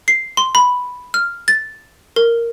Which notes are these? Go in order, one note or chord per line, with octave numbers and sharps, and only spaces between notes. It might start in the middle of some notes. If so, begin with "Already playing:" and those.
C7
C6
B5
F6
A6
A#4